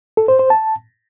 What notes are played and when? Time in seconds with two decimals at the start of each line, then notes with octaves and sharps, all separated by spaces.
0.17 A4
0.28 C5
0.39 C5
0.50 A5